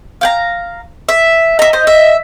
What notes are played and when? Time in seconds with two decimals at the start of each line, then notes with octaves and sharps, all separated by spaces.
0.21 F5 G5 A#5
1.09 E5
1.59 D#5 E5 A#5
1.73 C5
1.87 E5